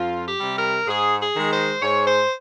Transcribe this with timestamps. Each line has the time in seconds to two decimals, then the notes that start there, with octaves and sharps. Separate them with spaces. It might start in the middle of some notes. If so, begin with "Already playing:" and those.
Already playing: F2 F4
0.24 G4
0.40 C3 G3
0.56 A#4
0.87 G#2 G#4
1.20 G#4
1.36 D#3 G#3
1.51 C5
1.83 G#2 C#5
2.06 C5